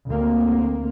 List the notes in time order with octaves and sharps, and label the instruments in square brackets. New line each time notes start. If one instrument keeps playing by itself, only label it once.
[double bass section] D2 A#3 C4